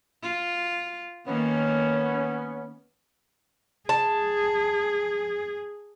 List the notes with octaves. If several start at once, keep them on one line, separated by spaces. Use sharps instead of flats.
F4
D#3 A#3 B3 C#4
G#4 A5